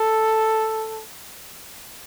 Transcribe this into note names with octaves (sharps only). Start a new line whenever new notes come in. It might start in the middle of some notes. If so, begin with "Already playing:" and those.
Already playing: A4